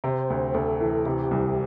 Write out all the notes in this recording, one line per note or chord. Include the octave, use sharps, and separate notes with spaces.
C3 C5
D2
D2 A4
E3
C3 G4
C2